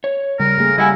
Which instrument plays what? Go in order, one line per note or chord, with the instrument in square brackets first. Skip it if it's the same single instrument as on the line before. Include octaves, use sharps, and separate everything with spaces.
[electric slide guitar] C#5
[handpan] C#3 [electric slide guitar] G3 [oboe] A#4
[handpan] A3 A#3 G#4
[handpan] G3 [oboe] E4 [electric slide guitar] D#5 F#5 G#5